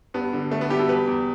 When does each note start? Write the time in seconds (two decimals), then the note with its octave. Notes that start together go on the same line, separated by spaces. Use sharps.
0.14 G2 B3
0.33 D3
0.51 D3 A3
0.61 B3
0.70 G3 E4 G4
0.80 F#4 A4
0.89 E2 G4 B4
1.07 E2